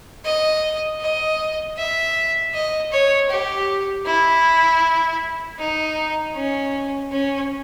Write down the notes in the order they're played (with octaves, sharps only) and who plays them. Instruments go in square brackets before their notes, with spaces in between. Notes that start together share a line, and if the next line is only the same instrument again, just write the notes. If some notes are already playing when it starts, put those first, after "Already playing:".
[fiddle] D#5
D#5
E5
D#5
C#5
G4
E4
D#4
C#4
C#4